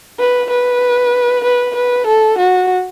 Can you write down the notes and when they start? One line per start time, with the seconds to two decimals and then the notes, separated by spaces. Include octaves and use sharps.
0.19 B4
0.50 B4
1.44 B4
1.76 B4
2.07 A4
2.38 F#4